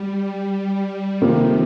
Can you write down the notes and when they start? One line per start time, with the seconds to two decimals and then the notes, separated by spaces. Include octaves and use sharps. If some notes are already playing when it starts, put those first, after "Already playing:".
Already playing: G3
1.22 C3 D#3 F3 A#3